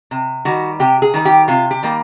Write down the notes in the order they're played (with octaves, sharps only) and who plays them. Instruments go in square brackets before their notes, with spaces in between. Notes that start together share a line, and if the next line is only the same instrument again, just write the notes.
[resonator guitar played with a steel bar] C3
D#3 G3 F#4
C3 G4
G#4
D#3 G3
G4
C3 F4
G4
D#3 G3 A#3